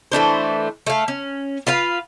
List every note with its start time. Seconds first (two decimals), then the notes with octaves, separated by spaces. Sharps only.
0.12 E3 A3 D4 C5
0.87 A3 F5
1.08 C#4
1.67 F4 B4 F5